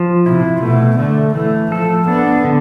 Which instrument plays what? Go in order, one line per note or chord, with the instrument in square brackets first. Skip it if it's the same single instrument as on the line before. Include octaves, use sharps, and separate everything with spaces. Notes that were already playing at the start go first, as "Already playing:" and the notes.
Already playing: [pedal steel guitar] F3
[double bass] C3 [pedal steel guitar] E4
[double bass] B2 [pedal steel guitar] A3
[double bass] D3 [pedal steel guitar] A3
[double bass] E3 [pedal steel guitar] A3
[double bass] F3 [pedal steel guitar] A4
[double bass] B3 [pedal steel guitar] D4
[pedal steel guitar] D3